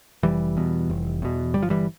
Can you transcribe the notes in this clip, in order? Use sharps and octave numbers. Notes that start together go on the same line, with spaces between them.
F1 E3 G3
E2 B2
F1
E2 B2
G1 G3
F3
E3 G3